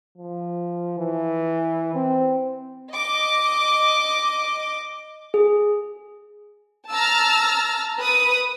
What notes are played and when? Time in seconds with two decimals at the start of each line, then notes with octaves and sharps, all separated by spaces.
0.18 F3
0.99 E3
1.95 C4
2.92 D#5 D6
5.34 G#4
6.90 A5 A#5 E6 F6 A6
7.99 B4 D#6